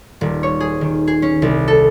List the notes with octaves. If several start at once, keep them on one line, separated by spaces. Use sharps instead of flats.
D#1
C#5
G#4
D#3
G#4
C#4
C2
A4